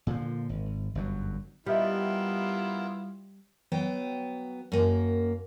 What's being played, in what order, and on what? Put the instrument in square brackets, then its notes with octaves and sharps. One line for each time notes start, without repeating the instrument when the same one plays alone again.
[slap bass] A#2 D3 D#3 F3
G#1
G1 F#2 F#3
[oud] G3 [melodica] B3 A#4 [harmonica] E4 F4 [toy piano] D#5 E5 G5
[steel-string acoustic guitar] F#3 B3 G5
F#2 A#3